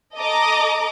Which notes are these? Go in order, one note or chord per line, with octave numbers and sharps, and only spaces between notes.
A4 D#5 A#5 D6